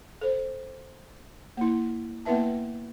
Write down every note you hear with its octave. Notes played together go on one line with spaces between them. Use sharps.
A4 C5
A#3 E4
A#3 B3 E4 B4 E5 A5